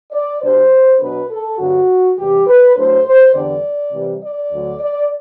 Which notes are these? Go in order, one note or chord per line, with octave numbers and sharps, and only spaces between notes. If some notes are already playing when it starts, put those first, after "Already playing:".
D5
B2 G3 D4 C5
B2 F#3 B3 D4 B4
A4
G2 D3 F#3 B3 F#4
E2 C3 E3 G3 G4
B4
A2 F#3 B3 D4 C5
C5
E2 D3 G3 B3 D4 D5
C3 E3 G3
D5
D2 D3 F#3
D5